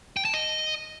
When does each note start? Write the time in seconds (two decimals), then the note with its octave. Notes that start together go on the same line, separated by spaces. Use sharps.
0.17 G5
0.25 A5
0.34 D#5